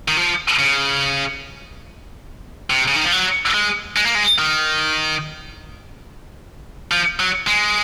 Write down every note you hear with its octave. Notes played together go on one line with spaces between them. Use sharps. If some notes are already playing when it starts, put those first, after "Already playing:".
D#3
F3
C#3
C3
C#3
D#3
F3
F#3
G#3
G#3
A#3
G#3
D#3
F3
F#3
G#3